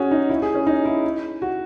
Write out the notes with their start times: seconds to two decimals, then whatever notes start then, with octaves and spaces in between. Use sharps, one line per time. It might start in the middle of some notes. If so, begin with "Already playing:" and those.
Already playing: C#4 F#4 G#4
0.11 D#4
0.30 E4
0.42 G#4
0.55 C#4
0.67 D#4
0.85 E4
1.42 F#4